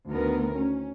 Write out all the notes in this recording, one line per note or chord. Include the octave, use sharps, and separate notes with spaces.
D2 D#3 B3 A#4
C#4